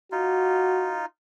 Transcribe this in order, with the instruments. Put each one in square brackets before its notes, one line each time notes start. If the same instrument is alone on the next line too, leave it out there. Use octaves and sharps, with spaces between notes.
[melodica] D#4 F4 [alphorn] F#4